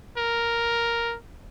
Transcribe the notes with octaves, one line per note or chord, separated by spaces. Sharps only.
A#4